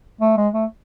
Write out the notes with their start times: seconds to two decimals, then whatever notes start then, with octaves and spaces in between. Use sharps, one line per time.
0.21 A3
0.37 G#3
0.53 A3